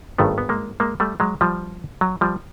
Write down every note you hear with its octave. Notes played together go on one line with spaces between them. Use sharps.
G#1 G2 D#3 A3 B3
B3
G#3 A#3
G#3 A#3
G3 A3
F#3 G#3
F3 G3
F#3
F3 G3